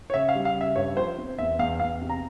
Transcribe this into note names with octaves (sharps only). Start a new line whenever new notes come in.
C#5
C#3 E5
F5
G3
F5
C#3 E5
G2 C#5
F3 C5
C4
E2 E5
E2 F5
E2 F5
C3
A#5